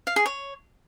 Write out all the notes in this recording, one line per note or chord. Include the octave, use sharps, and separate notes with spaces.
F5
G#4
C#5